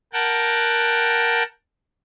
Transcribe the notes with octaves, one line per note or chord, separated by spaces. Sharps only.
A#4 F#5 G5 A5